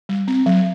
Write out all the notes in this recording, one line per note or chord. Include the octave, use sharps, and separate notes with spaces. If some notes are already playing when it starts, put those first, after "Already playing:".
G3
C4
F#3